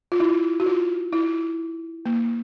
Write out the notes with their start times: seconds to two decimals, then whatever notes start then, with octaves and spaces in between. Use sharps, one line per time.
0.12 F4
0.20 E4
0.60 F#4
0.66 F4
1.13 E4
2.06 A#3